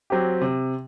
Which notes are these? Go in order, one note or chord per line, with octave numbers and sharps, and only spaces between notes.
F#3 C4 G4
C3